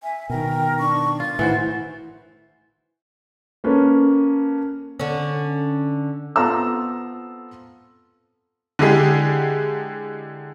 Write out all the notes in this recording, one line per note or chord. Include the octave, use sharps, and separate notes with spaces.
E5 G#5
B2 D#3 A#4 G5
D4 C#6
F4 A6
A2 D#3 E3 E4 F#4 C5
A#3 C#4 A4 B4
D3 C#4
B3 C4 F4 A4 A#5 E6
D3 G#3 E4 G4 G#4